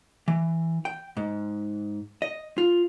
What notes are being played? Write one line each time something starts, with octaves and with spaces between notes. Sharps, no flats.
E3
G5
G#2
D#5
F4